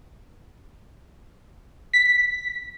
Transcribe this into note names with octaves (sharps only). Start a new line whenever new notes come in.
B6